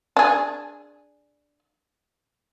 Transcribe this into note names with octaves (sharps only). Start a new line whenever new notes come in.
D4 G#4